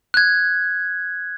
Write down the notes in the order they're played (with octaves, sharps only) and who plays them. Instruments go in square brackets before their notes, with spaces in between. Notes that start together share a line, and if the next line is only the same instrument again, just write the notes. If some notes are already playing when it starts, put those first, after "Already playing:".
[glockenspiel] F#6 G#6